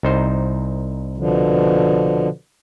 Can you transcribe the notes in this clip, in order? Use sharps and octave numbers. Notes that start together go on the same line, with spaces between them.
C2 D#4 C5
B2 D3 F3